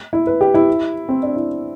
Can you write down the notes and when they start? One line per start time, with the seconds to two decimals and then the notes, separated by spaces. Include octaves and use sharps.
0.13 E4
0.27 B4
0.41 G4
0.54 E4
1.09 C4
1.23 D4
1.36 E4